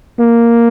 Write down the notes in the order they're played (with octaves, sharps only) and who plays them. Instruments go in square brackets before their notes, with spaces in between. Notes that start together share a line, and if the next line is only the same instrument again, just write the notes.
[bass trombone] A#3